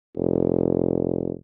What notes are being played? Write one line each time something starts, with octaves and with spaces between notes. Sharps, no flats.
F1